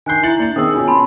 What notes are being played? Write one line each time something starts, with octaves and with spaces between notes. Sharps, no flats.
D#3 G#5 F#6 G6 C7
E4 E5 A#5 A6 C#7 F#7
A#3 D4 F#7
D#3 B3 C4 G#4 D#6 E6
B2 C#4 F4 G#5
A5 B5 C6